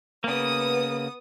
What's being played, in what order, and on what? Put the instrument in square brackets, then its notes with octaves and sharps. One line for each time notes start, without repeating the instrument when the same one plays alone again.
[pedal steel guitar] C#3 A#3 [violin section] B3 D#6